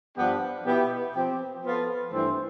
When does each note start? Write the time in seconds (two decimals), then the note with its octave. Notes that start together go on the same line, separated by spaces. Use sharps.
0.16 G2 F3 B3 D4 G4
0.66 B2 B3 E4 G4
1.14 F3 C4 G4
1.63 F3 B3 F4 A4
2.12 G2 E3 A3 C4